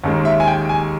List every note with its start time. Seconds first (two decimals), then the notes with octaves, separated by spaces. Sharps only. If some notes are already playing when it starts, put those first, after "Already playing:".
0.04 D#2 D#3 G#3
0.25 E5
0.40 G#5
0.48 G5
0.69 G#5